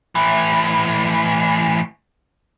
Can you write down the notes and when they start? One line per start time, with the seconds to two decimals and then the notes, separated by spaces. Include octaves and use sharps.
0.15 A2 E3